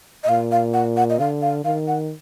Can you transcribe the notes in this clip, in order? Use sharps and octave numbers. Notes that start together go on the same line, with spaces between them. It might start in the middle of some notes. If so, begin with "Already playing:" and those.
D#5
A#2 F5
F5
F#5
F#5
D#5
D3 F5
F5
D#3 F5
F#5